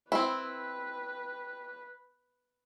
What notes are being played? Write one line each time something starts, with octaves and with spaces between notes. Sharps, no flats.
C4 E4 B4